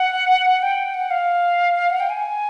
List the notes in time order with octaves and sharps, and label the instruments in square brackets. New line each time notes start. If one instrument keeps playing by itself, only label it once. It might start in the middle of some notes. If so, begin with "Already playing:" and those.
Already playing: [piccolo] F#5
G5
F#5
F5
F#5
G5
G#5